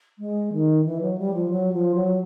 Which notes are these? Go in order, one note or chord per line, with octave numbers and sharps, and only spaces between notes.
G#3
D#3
E3
F#3
G3
F3
F#3
F3
F#3